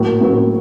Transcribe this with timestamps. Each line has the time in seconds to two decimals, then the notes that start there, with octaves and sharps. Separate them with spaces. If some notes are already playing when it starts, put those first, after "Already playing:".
Already playing: A2 F#3 A#3
0.21 A2 F#3 A#3